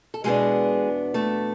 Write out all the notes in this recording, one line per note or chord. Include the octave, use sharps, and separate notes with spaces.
A4
E2 B2 G3 G#3 B3 D4 G#4
A3 A4